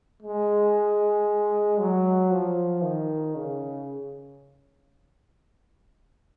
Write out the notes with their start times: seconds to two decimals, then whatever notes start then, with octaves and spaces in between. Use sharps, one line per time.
0.23 G#3
1.80 F#3
2.31 F3
2.83 D#3
3.36 C#3